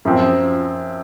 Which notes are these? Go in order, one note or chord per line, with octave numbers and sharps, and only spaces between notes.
F#2 F3 C4